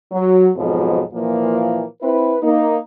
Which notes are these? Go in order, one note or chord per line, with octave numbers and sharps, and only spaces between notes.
F#3
F2 G#2 B2 F3 F#3
A#2 E3 F3 A#3
C4 E4 B4
A#3 D#4